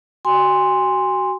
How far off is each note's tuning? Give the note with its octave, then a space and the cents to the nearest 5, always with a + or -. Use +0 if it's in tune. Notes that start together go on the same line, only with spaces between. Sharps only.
F#4 +25 G#5 -30 C6 +0